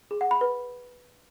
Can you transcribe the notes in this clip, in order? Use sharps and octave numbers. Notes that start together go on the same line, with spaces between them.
G#4
F#5
B5
B4